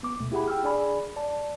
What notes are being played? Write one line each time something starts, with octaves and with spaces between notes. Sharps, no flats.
B3 D6
D2 B2 A3
E4 G4 G#4 F#5 B5
G5 E6 F6
D4 G#4 D5 G#5 B5
D5 A5